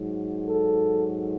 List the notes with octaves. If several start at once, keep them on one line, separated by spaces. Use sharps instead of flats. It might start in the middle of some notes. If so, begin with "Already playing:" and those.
Already playing: G#2 F#3
A4